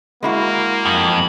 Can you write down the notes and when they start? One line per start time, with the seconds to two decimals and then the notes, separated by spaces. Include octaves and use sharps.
0.23 G#3 A#3 E4 F#4
0.86 F2 B5